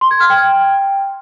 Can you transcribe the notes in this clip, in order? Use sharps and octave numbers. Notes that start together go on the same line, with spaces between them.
C6
G#6
F6
G5